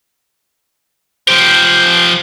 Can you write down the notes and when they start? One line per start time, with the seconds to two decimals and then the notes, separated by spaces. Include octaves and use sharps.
1.28 F3 G4 C5